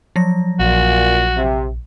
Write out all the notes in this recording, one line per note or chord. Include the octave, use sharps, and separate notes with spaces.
F3 F#3 A#6
A#1 A#2 F#4
C3